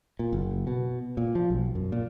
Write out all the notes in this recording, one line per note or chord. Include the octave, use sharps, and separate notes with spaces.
A#2
F#1
B2
A#2
F3
B1
F#2
A#2